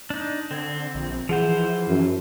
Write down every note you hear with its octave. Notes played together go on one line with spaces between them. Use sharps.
D4 D#4
D3 C4 G#6 E7
A#1
E3 F3 G#4 C5 F#5
F#2